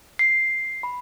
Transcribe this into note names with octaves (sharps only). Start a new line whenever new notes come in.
C7
B5